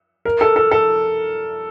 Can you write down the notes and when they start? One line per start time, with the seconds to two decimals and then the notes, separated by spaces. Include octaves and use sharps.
0.25 A#4
0.41 A4
0.56 A4
0.71 A4